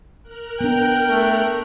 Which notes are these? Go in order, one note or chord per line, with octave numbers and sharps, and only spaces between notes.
A#4 F6 F#6
B3 D4 G5
A3